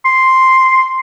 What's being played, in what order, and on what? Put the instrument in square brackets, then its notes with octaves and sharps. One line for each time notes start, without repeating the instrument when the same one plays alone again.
[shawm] C6